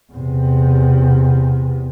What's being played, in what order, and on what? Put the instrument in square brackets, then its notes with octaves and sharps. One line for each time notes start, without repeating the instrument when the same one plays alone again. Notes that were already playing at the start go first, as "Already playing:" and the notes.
[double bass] E2 C3